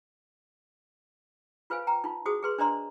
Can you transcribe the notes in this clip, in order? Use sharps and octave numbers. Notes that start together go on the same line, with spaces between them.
F4 B4 C5 F5 G#5
G5 A#5
D#4 F4
F#4 G#4 C5 D#6
G#4 B4 C6
D4 C5 D5 D#5 A#5 C6